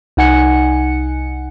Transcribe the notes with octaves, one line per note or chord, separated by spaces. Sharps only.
C2 D#4 F#5 G#5 C#7